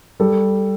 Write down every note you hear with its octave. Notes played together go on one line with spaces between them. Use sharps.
G3 A4